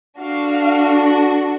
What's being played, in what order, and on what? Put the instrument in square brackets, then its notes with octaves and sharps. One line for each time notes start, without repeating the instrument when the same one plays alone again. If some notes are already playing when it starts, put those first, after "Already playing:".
[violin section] D4 F#4 A4 F5